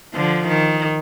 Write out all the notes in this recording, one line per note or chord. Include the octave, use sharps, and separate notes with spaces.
D3 F3
D#3